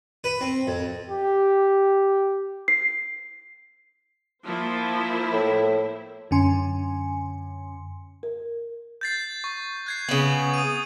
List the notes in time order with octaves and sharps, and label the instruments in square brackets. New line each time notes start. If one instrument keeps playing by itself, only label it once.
[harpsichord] B4
C4
F2
[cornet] G4
[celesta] C7
[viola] F3 [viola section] A#3 E4 C5
[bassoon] A2
[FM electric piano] F#2 D3 C#4 G#5 C6
[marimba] A#4
[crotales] G6 A6 C7
C#6
F#6 G#6 C7
[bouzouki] C#3 B3 [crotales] F#7
[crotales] D#6 D#7